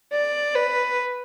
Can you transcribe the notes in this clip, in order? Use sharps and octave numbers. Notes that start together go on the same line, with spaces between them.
D5
B4